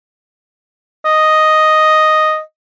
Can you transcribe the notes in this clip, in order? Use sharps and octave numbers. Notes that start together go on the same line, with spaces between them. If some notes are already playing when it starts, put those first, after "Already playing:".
D#5